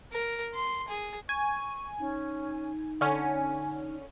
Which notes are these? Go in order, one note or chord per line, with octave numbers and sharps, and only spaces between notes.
A#4
C6
G#4
G#5 C#6
C#4 D#4
D3 C#4 G#5